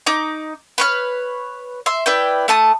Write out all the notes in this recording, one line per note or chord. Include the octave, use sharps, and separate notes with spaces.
D#4 D6
B4 C#5 F6
E5 C6
E4 B4 D5 G5
A3 A5 D#6